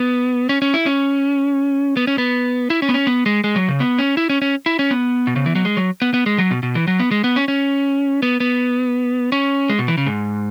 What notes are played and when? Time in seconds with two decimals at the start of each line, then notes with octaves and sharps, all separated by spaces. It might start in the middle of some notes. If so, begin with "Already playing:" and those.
Already playing: B3
0.49 C#4
0.62 C#4
0.74 E4
0.86 C#4
1.97 B3
2.07 C#4
2.18 B3
2.70 E4
2.82 C#4
2.89 B3
2.94 C#4
3.07 B3
3.26 G#3
3.44 G#3
3.56 F#3
3.68 C#3
3.80 B3
3.99 C#4
4.17 E4
4.30 C#4
4.42 C#4
4.66 E4
4.79 C#4
4.91 B3
5.27 B2
5.36 C#3
5.46 E3
5.55 F#3
5.65 G#3
5.77 F#3
6.02 B3
6.14 B3
6.26 G#3
6.38 F#3
6.51 B2
6.63 B2
6.75 E3
6.88 F#3
6.99 B3
7.11 G#3
7.24 B3
7.36 C#4
7.48 C#4
8.22 B3
8.40 B3
9.32 C#4
9.69 G#3
9.79 B2
9.88 E3
9.98 C#3
10.06 G#2